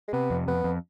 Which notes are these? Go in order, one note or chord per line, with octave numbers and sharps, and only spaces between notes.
G#3
C3 B3
F2
F2 B3
F2